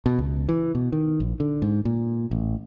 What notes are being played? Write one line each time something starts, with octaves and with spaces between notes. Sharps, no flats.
B2
C#2
E3
B2
D#3
A#1
D3
G#2
A#2
A1